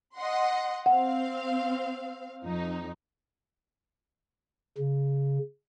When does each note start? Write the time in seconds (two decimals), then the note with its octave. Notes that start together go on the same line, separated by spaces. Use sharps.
0.15 D#5 F#5 C6
0.86 C4 F5 F#5
2.43 F2 D#4
4.78 C#3